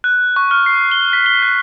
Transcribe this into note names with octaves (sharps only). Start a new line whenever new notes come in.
F#6
C#6
F6
C7
G7
B6
G7
F#6